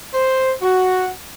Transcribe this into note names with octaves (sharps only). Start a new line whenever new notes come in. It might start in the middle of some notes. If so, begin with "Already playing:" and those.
C5
F#4